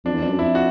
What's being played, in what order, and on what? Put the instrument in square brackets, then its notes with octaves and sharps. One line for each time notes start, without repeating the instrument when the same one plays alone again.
[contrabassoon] F2 [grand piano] D4
[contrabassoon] E2
[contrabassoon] F2 [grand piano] D4
[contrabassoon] F#2
[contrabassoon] F2 [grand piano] E4
[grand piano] F#4